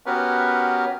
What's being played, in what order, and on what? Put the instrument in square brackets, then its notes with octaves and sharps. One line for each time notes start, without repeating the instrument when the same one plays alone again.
[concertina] B3 C#4 F#4 G4 A#4 B4